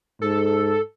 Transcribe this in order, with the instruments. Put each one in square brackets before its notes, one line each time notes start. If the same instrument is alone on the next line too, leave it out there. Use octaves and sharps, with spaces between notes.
[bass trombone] G#2 [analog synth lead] A4